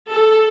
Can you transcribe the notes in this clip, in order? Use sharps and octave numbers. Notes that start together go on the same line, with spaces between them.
A4